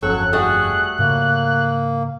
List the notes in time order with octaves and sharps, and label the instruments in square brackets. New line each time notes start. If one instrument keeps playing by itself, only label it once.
[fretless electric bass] G1 F2 C#4 [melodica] F#3 C#6 [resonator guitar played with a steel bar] A4 [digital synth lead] F#6
[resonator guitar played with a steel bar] G3 A3 F#4 [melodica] G#4
[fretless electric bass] G#2 C#3 [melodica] A#3